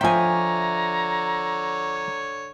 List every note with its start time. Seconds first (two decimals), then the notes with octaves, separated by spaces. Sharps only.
0.01 D3 F3 C#5 E5 G5 G#5 A#5